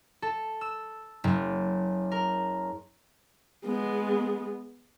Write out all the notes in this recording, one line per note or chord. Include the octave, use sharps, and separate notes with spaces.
A4
E6
F#1
A#4
G#3 B3